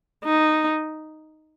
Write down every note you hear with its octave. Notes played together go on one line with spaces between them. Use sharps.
D#4